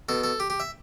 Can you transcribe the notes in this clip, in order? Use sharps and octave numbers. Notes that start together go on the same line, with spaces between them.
B2 A4
A4
G4
G4
E5